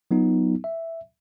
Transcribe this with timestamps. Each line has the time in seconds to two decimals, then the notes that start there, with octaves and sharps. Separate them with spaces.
0.11 F#3 B3 D#4 F4
0.64 E5